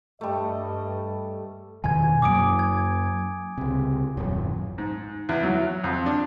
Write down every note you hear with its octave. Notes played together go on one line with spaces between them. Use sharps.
G2 G3 A3 D#5
E2 B2 D#3 G#5 G#6
F#2 F#3 A#3 D6 D#6 D7
G#6
C#2 C3
D#1 A1 F#2
G#2
E2
F#3
F2
D4